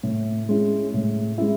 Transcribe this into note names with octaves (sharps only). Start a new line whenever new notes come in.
A2
G#3 C#4 E4
A2
G#3 C#4 E4